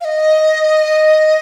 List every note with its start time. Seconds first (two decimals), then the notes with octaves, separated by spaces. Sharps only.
0.01 F5
0.05 D#5